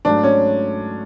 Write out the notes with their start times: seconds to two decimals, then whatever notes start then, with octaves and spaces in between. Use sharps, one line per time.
0.05 G#2 F#3 A3 D4
0.24 C#4